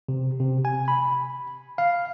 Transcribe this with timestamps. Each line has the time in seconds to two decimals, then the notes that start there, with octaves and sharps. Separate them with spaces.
0.09 C3
0.40 C3
0.65 G#5
0.88 B5
1.78 F5